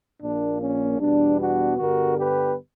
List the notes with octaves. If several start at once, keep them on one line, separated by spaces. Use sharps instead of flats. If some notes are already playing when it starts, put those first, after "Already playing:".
A#1 A#2 A#3 D4
C#4
E2 B2 G3 B3 D4
D4 F#4
G2 D3 G3 B3 F#4 A#4
G4 B4